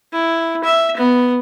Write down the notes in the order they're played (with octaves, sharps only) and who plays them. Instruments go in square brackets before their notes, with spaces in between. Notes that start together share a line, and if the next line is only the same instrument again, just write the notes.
[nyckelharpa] E4
E5
B3